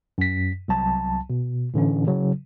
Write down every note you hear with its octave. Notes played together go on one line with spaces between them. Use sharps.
F#2 B6
C2 F#3 A5
B2
A2 D3 E3 C#4
C#3 F#3